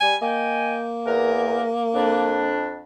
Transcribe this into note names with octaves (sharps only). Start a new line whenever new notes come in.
G3 G#5
A#3 D#5 G5 G#5
E2 A#4
F2 D4